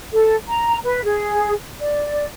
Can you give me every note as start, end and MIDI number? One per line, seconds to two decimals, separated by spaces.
0.13 0.35 69
0.48 0.77 82
0.84 1.04 71
1.04 1.52 68
1.80 2.26 74